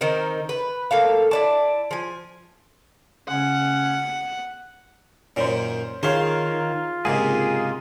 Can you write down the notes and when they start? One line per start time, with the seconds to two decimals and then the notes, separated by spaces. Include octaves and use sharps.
0.01 D#3 C4 D#4 A#4
0.49 B4
0.91 A2 A#3 A4 F5
1.31 E4 D5 A5
1.91 F3 G#5
3.28 C#3 C#4 F#5
5.36 F#2 A#2 D#3 C#4 C5
6.03 D#3 F4 G#4 C5 C#5 F5
7.05 C#2 G#2 C3 A#3 G#4